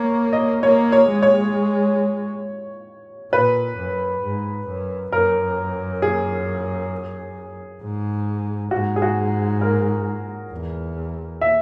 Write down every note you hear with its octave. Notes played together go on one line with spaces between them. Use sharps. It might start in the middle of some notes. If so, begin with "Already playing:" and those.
Already playing: A#3 C#5
D#5
A#3 C#5
C#5
G#3
C#5
A#2 B4
F#2
G#2
F#2
F#2 A#4
G#4
G#2
G#2 F#4
G#4
F#4
A#4
E2
E5